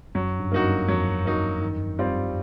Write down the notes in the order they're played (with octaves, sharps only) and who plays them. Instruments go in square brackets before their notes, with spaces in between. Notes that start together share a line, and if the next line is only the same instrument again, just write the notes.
[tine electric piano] F#2 [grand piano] F#3
[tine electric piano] G2
[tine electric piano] G2 [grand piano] A#3 D#4 F#4
[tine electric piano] F#2
[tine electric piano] F2 [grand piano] F#3
[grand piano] A#3 D#4 F#4
D#3
G3 C4 F4